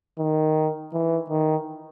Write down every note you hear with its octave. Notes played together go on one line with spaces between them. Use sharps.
D#3
E3
D#3